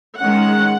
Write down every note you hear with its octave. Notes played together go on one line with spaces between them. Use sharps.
D#3 G#3 C#4 F#5